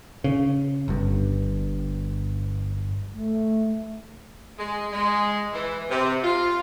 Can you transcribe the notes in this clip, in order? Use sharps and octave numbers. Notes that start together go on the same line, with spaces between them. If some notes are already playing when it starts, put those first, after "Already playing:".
C#3
G1 G2
A3
G#3
G#3
E3
C3
F4